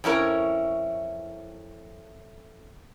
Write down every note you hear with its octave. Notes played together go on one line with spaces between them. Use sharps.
F2 C#4 E4 A#4